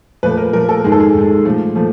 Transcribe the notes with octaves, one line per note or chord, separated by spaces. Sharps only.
A#2 F3 A3 B4
A#4
A#2 F3 A3 A#4
A4
G#2 D#3 G#3 G#4
A4
G#4
G#2 D#3 G#3
A#2 F3 A3
A#2 F3 A3